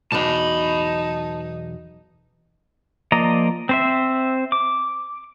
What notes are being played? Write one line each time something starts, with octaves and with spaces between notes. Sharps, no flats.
B1 E2 D#4 A5 B5
F3 A#3 D5 D#5 A#5
C4 C5 E5
D6